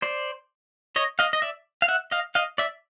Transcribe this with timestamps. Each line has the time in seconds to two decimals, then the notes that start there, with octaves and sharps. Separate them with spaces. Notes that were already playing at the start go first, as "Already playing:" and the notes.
0.02 C5 D5
0.96 C#5 D#5
1.19 D#5 F5
1.33 D#5
1.42 D5 E5
1.82 F5
1.88 E5 F#5
2.11 D#5 F5
2.35 D#5 F5
2.58 D5 E5